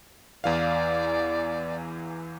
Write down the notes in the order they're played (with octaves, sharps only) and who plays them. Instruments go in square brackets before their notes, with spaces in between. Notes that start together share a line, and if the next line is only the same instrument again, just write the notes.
[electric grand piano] E2 E3 F5 [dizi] D5